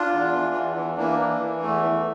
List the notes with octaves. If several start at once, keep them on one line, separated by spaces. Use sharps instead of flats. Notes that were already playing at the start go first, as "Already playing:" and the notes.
Already playing: D4 F4
E2
E3
E2
E3
E3 A#3 D4
E3
E3
E2 A3
E3